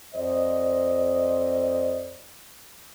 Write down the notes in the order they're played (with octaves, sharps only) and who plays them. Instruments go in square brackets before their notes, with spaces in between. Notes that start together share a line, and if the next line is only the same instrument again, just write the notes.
[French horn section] F2 C5 D5 D#5